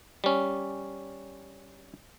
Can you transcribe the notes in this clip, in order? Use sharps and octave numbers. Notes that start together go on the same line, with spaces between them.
G3 C#4